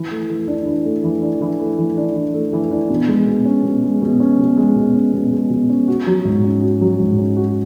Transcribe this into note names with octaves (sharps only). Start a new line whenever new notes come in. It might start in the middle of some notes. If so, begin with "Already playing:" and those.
Already playing: E3
A3
E3
D4
E3
A3
E3
D4
E3
A3
E3
D4
E3
A3
E3
D4
B2
G#3
B2
C#4
B2
G#3
B2
C#4
B2
G#3
B2
C#4
B2
G#3
B2
C#4
F#4
F#3
G#2
C#4
F#4
F#3
G#2
C#4
F#4